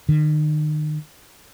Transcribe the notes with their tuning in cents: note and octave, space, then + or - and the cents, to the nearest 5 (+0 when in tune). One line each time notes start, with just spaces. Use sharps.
D#3 -35